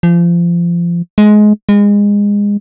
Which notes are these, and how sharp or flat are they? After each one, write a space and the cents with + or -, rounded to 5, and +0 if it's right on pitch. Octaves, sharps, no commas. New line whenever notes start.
F3 -25
G#3 +20
G#3 -25